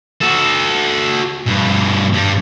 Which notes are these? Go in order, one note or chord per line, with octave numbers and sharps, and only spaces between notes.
F#4 A4
G2 B2
G2 G3